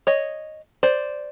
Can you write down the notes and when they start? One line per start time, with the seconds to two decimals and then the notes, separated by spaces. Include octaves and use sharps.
0.07 C#5 D#5
0.83 C5 D5